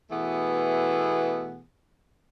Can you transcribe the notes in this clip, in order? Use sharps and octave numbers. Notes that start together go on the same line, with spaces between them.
B2 E3 A3 B3 G#4